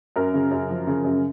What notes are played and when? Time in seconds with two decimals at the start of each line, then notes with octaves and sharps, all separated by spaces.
0.16 F#2 A#4
0.34 C#3
0.51 F#2
0.70 F3
0.87 C#3
1.04 F#2